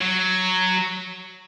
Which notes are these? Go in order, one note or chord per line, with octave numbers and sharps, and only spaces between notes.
F#3